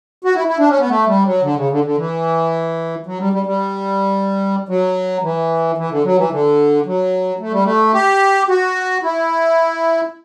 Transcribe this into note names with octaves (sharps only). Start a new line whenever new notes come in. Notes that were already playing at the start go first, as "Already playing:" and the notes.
F#4
E4
E4
D4
C#4
B3
A3
G3
F#3
D3
C#3
D3
D3
E3
F#3
G3
G3
G3
F#3
E3
E3
D3
F#3
E3
D3
F#3
A3
G3
A3
G4
F#4
E4